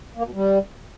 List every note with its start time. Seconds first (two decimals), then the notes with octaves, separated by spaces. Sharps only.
0.17 A#3
0.25 B2
0.34 G3